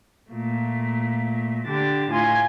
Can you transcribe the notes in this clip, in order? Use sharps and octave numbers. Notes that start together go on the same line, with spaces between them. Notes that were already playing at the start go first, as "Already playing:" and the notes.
A#2 A3
D3 D4 G4 A6
A2 F4 G#5 C6 G#6